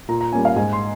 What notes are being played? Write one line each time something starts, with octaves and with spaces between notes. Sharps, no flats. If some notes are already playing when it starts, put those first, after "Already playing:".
A#2 A#5
A#5
G3 A#3 C#4 G#5
F5
G#2 G#5
C6